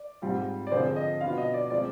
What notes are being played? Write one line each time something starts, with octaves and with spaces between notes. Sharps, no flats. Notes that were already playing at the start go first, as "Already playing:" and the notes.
Already playing: D5
G#2 G3 C4 F4
D5
D3 F3 C4 F4 G#4 C5
D#5
B2 B3 D4 F4 F5
D#5
D5
F3 G#3 C4 F4 D5